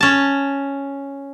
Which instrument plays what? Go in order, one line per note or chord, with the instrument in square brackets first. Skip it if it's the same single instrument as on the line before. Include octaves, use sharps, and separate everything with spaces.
[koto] C#4 A5